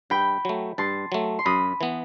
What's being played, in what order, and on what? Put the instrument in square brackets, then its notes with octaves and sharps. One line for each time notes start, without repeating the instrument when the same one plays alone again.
[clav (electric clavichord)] G2 [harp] G5 B5
[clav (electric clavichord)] F#3 A3
[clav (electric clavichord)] G2 [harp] A5 C6
[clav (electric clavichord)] F#3 A3
[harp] C6
[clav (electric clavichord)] F#2 [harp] B5 D#6
[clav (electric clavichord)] E3 B3